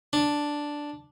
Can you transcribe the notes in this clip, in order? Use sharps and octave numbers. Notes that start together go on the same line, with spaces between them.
D4